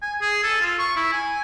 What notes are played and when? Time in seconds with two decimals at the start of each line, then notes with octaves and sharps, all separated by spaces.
0.02 G#5
0.21 G#4
0.43 A4
0.61 F4
0.79 C#6
0.96 E4
1.13 G#5